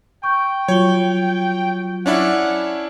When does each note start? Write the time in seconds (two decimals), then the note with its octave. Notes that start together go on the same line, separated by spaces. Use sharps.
0.23 G5 C#6 G6
0.68 F#3 F4 C#5 G7
2.06 C#4 D4 E4 F#5